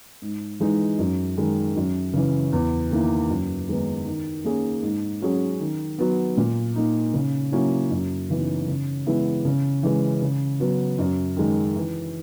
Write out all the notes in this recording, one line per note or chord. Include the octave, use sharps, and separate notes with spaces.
G#2
E3 G#3 D#4
F#2
D#3 G#3
F#2
C#3 E3
E2
D#3 A#3 E4
F#2
D#3 G#3 B3 D#4
D#3
A#3 C#4 G#4
G#2
F#3 C#4 G#4
D#3
F#3 B3
A#2
A#3 D#4
C#3
F#3 A#3 C#4 E4
F#2
C#3 E3 B3 D#4
C#3
E3 G#3 B3 E4
C#3
E3 G#3
C#3
F#3 B3
F#2
D#3 G#3
E3